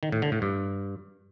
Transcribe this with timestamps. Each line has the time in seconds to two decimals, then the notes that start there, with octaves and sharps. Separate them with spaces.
0.03 D#3
0.12 A2
0.22 D3
0.32 A2
0.42 G2